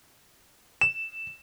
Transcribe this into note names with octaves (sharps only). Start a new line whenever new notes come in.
E7